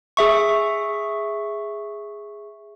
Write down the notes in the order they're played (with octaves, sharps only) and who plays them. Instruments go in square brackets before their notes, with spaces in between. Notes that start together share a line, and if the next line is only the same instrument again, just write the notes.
[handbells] G#4 E5 C#6